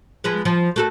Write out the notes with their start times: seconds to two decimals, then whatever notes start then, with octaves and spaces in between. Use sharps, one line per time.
0.24 F3 G#3 B3
0.45 F3
0.76 A3 F#4 A4